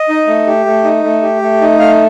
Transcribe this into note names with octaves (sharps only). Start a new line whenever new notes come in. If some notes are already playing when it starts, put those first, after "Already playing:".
Already playing: D#5
D#4
A3
G4
A3
D#4
A3
G4
A3
D#4
A3 F5